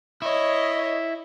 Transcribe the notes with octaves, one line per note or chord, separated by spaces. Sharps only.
E4 C#5 D#5